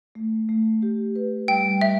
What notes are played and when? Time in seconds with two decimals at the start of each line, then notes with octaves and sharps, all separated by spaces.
0.15 A3
0.49 A3
0.83 G4
1.16 B4
1.48 G3 G5
1.81 G3 E5